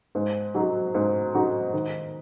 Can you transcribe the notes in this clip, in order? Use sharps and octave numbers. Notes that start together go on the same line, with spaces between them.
G#2
F#3 D#4 F#4
G#2
F#3 D#4 F#4
D#3